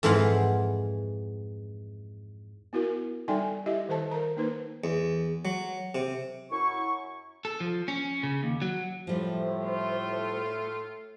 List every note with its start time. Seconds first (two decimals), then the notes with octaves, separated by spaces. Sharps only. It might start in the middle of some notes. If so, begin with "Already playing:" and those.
0.03 F2 G#2 E3 B4 F5 F#5
2.73 B3 E4 F#4 A#4
3.28 G3 D#4 A4 D5 G5 G#5
3.66 E4 G4 D#5 E5
3.89 D#3 A4 C5 A5
4.11 A#4 A#5
4.37 A#3 D#4 B4 C5
4.84 E2
5.45 F#3
5.95 C3
6.51 F#2 E4 C#6
7.45 A4
7.60 F3
7.88 C#4
8.23 C#3
8.43 D#2
8.62 F#3
9.07 A2 F3 G3 C5
9.63 A3 F4